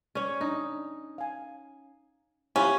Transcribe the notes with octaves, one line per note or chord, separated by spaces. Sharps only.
C#4 C#5 D5
D4 D#4
F5 G#5
B3 C#4 E4 F4 G4 B5